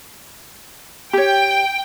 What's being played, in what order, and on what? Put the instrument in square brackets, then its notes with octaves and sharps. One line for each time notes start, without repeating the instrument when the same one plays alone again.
[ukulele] G4 C#5 [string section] G5